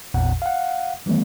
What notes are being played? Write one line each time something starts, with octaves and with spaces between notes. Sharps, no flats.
A1 E2 A#2 F#5
F5 F#5
D#3 E3 G3 A3 B3